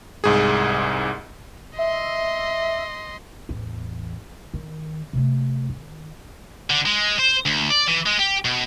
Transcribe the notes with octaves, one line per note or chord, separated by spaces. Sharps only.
C2 G#2 G#4
D#5 E5 C6
A1 E2
D#3
C3 A3
D#3
D3
G#3
C5
D2
D5
E3
G#3
G4
B2